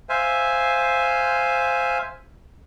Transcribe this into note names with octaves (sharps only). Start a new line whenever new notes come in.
C5 E5 F5 G#5